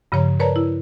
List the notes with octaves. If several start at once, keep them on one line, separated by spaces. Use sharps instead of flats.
G2 C#3 F3 C#5 A#5
A#4 B4 C#5 D5 A5 A#5
E4